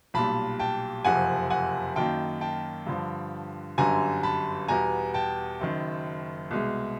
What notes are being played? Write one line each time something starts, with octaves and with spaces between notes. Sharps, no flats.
B1 A#2 G3 A5 B5
G5 A5
F#1 F2 C3 F3 F#5 G#5
F#5 G#5
F#2 D#3 F#3 A#3 G5 A5
G5 A5
G2 D3 F3
G1 F#2 D3 G3 G#5 A#5
A5 B5
E2 B2 G3 B3 G#5 A#5
G5 A5
F#1 F#2 D#3
C2 B2 G#3